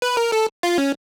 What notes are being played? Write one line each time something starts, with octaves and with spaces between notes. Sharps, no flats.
B4
A#4
A4
F4
C#4